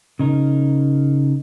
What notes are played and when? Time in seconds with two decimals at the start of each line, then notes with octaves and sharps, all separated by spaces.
0.19 C#3 D#4 A#4